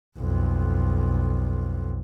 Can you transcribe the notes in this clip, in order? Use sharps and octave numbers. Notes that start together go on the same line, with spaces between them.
B1 F2